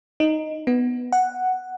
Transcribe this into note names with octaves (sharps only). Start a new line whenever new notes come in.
D#4
B3
F#5